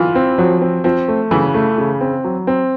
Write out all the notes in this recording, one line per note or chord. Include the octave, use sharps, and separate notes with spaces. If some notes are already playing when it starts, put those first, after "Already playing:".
Already playing: E3 F4
C4
F3 F#3
C4
F3 C4
A3
C#3 E3
A3
C#3
C4
F#3
C4